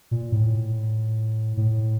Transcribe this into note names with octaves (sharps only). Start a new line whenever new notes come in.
A#2
A2
A2